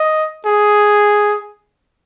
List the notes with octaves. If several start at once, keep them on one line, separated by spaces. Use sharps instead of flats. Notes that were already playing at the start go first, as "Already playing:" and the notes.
Already playing: D#5
G#4